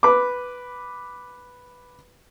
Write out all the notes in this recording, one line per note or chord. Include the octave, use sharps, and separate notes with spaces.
B4 D6